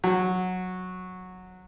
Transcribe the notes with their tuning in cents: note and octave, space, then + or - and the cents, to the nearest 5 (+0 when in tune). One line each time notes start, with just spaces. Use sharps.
F#3 -10